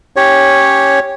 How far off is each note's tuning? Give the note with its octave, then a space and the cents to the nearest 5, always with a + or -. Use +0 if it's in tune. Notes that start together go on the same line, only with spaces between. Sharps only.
C#4 +0 G4 +0 C#5 -5